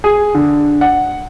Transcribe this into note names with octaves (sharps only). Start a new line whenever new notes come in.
G#4
D3
F#5